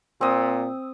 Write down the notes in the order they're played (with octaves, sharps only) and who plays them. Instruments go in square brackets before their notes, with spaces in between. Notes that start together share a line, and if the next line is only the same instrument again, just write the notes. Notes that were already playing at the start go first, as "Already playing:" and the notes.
[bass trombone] A#2 [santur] C4 D#6